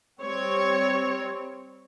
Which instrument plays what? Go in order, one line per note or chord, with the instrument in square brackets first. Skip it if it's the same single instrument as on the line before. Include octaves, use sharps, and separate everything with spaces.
[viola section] G3 C4 C#5